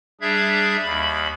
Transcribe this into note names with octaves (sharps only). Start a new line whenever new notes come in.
G3 D4 G#4 E5 G#6
D#2 B5